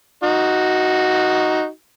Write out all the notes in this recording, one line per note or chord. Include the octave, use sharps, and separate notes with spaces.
D#4 F#4